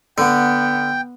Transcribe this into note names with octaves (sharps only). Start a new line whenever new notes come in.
D3 B3 G5